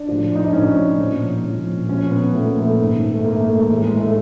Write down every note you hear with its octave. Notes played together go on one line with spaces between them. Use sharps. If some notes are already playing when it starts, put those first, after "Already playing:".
Already playing: D4
A2 F3
D#4
D4
A2 F3 C#4
A#2 F3
A#2 F3
A#2 F3 C#4
B3
A#2 F3 A3
A#3
A3
G#2 D#3
A3
G#2 D#3 A#3
A3
A3
G#3
A2 E3
G#3
A3